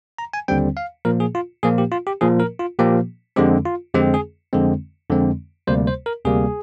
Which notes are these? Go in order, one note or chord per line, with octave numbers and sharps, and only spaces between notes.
A#5
G#5
D#2 D3 G3 C4 G5
F5
A#2 F3 A#3 A#4
G#4
F4
A#2 F3 A#3 G#4
G4
F4
G4
A#2 F3 A#3 G#4
A#4
F4
A#2 F3 A#3 G4
F2 D3 G#3 C4 G4
F4
F2 D3 G#3 C4 G4
G#4
F2 D3 G#3 C4
F2 D3 G#3 C4
D2 C3 G3 A#3 C5
C5
A#4
D2 C3 G3 A#3 G#4